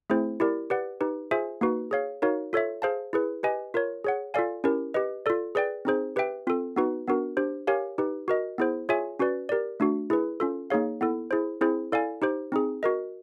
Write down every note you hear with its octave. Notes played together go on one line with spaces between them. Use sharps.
A3 C4 E4 G#4 C5
E4 G4 A#4 D5
G4 B4 D5 F#5
D#4 G4 B4
F4 G#4 C5 E5 G#5
A#3 D#4 F#4 B4
G#4 C#5 F5
D#4 F#4 A#4 C#5 F5
F4 A4 C#5 E5
G#4 C5 F5 A5
E4 G#4 B4
G4 B4 D#5 G#5
F4 A#4 C#5
G#4 C#5 F#5
F4 A4 D5 F5 G#5
C#4 E4 G4 A#4
G4 B4 D#5
F4 A4 D5
G#4 B4 D5 G5
C4 D#4 G#4 C5
G4 B4 E5 G5
C4 F4 A4
B3 D#4 F#4 B4
B3 D4 F#4 A#4
D4 G4 C5
G4 A#4 C#5 F5 G#5
D#4 G4 B4
F#4 A#4 D#5
B3 E4 G#4 C5
F4 G#4 C#5 E5 G#5
C#4 F#4 B4 D5
G4 A#4 D5
A3 D4 F#4
E4 G#4 B4
C#4 F4 A4
A#3 D#4 G#4 C#5 F5
B3 E4 A4
E4 G#4 C5
C4 E4 G#4 C5
E4 A4 D5 F5 G#5
D#4 G4 C5
C4 D#4 G#4
F#4 A#4 D#5